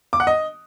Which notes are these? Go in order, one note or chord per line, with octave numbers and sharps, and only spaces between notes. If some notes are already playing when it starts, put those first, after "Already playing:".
D6
F#5
D#5